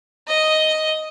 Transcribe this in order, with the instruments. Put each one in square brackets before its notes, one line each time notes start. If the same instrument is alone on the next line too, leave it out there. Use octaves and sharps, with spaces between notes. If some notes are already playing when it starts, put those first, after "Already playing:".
[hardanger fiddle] D#5